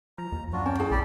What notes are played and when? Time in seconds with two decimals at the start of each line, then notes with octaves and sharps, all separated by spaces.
0.18 F3 A#5
0.32 D#2
0.53 F#2 D4 F4 F#4
0.66 C#4 C#5 G5 A5
0.79 E4 G#4 A5
0.91 A#1 G3 G4 D5